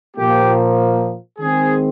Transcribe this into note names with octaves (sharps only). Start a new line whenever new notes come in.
A#2 F3 A#3 G4
D#3 G#3 C4 G#4